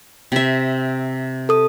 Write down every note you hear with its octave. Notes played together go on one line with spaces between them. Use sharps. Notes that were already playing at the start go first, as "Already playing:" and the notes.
C3 E5
A4 D#6